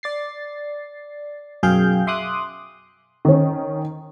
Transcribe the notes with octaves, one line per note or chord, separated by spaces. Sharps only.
D5 A6 C7
B1 F#2 G#4 F5 G5 G6
E5 C6 D6 D#6 F#6
D#3 C#4